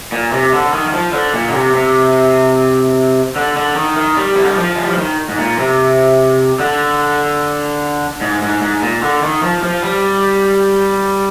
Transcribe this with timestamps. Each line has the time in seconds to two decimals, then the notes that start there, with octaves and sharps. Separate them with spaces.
0.12 A#2
0.33 C3
0.53 D3
0.73 D#3
0.87 D#3
0.93 F3
1.13 D3
1.33 A#2
1.48 D3
1.54 C3
1.74 C3
3.36 D3
3.57 D3
3.76 D#3
3.97 D#3
4.17 G3
4.35 C3
4.43 D3
4.50 D#3
4.57 F3
4.75 G#3
4.83 G3
4.90 F3
4.98 D#3
5.29 G#2
5.38 A#2
5.59 C3
6.60 D3
8.21 G#2
8.42 G#2
8.62 G#2
8.82 A#2
9.02 D3
9.23 D#3
9.43 F3
9.63 F3
9.83 G3